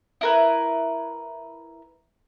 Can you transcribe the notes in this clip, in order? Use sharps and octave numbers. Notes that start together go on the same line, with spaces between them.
E4 A#4 B4